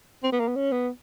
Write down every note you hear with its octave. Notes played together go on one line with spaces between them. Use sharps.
C4
B3
A#3
B3
C#4
B3